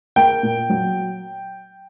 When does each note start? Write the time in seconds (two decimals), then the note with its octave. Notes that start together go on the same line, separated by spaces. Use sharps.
0.16 A#3 G5
0.43 A#2
0.70 F#3